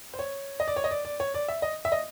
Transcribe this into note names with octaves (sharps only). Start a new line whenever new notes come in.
C5
C#5
D#5
D5
C#5
D#5
D5
D5
C#5
D5
E5
D#5
E5
D#5